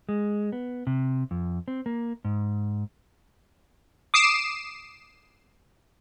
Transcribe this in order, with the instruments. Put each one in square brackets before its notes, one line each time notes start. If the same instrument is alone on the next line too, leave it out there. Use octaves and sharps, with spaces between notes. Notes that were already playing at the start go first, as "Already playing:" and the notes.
[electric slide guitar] G#3
B3
C3
F2
C4
A#3
G#2
[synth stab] D6 D#6 C7 D7 E7